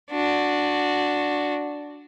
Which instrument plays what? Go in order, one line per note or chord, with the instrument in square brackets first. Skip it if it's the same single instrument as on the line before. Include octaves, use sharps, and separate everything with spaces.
[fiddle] D4 F#4